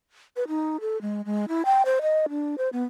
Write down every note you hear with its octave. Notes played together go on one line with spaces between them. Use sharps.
B4
D#4
A4
G#3
G#3
E4
G5
C5
D#5
D4
C5
B3